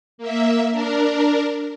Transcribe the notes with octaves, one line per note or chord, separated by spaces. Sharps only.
A#3 E5
D4 A#4